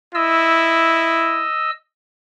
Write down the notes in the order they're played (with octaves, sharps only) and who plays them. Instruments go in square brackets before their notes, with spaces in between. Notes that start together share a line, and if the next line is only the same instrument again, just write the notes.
[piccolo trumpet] E4 [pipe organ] D#5 E6